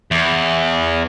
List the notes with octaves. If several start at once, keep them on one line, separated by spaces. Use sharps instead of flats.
E2